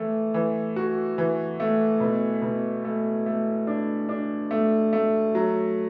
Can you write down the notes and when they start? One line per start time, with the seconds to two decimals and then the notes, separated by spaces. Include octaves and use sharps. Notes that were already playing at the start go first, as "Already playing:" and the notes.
Already playing: E3 A3
0.34 E3
0.76 F#4
1.18 E3
1.60 A3
2.00 B2
2.42 B2
2.85 A3
3.26 A3
3.67 D4
4.09 D4
4.51 A3
4.93 A3
5.35 F#3